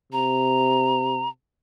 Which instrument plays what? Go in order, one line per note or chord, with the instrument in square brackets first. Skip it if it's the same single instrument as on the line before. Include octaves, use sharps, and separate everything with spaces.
[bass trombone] C3 [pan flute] A#5